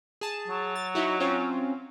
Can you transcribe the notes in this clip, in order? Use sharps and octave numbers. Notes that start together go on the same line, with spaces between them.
G#4 A5
F#3
A6
D#4 E4 F#4
C4 C#4 F4